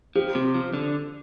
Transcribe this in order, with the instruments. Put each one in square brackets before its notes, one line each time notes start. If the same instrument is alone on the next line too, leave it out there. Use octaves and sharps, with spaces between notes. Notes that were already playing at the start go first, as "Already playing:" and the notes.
[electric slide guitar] F3 [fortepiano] G4
[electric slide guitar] C3
F3
D3